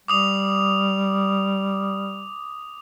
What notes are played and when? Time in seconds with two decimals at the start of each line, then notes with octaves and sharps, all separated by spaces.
0.08 G3 D6 D#6 F7